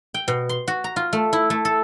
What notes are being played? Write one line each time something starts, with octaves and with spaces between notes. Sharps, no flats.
G5
B2
C6
F#4
A#5
F4
A3
E4
A3
A4